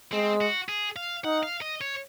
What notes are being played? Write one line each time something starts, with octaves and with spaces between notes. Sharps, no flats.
G#3 C4
F#4
G#4
F5
D#4 F#5
F5
D#5
C#5